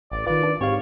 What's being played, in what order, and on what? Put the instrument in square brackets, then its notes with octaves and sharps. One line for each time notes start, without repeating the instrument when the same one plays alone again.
[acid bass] A1 [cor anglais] D5
[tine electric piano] D#3 B4 [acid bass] F4 [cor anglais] D5
[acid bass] D4
[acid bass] G#2 [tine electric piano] C4 G4 F5 [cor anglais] C#5